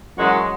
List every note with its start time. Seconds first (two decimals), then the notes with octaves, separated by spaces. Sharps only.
0.18 F#2 E3 G#3 F#4